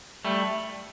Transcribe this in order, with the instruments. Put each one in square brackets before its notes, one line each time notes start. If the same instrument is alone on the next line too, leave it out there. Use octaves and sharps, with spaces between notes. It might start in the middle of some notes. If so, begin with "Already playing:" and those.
[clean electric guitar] G3 A3